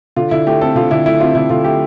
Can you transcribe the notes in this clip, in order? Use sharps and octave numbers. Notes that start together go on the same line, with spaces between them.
D3 F4
D3 E4
A3 G4
C4 A4
D3 F4
D3 E4
A3 E4
C4 F4
D3 E4
D3 F4
A3 G4